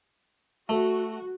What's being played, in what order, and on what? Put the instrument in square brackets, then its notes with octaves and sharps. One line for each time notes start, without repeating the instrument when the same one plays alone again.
[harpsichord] A3 [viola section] F#4